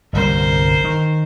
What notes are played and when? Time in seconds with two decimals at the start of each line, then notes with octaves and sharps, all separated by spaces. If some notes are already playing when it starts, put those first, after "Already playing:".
0.13 G1 C2 G3 A#4 C5
0.84 D#3